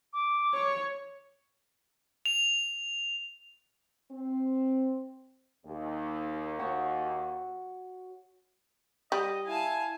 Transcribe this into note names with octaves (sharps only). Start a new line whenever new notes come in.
D6
C#5
F7
C4
D#2
F#4 C#5
G3 D#5
E4 F5 G#5 A5